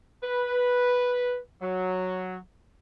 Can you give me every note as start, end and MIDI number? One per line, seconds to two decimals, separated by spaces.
0.23 1.38 71
1.62 2.37 54